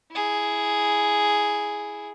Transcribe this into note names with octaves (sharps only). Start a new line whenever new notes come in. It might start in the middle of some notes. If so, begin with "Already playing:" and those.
E4 G#4